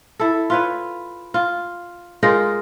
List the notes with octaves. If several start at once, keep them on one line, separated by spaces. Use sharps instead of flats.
E4 A4
F4 B4 C#5
F4
G#3 D#4 F4 A#4